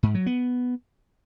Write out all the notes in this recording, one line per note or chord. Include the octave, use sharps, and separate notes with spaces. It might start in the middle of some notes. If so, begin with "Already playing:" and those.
G#2
F#3
B3